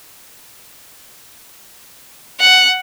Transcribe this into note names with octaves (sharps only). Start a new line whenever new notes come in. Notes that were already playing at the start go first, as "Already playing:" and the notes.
F#5